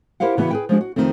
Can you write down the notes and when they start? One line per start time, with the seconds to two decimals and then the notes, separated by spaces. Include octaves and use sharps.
0.20 E4 G4 A#4 C5 F5 F#5
0.37 C#3 E3 B3 F#4
0.51 G#4 B4 G5
0.69 F3 G#3 D4 F#4
0.81 F#4
0.96 F2 D#3 F3 A3 C4